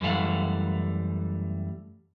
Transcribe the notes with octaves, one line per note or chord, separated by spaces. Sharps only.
F#2 E3 G3 A3 F5 F#5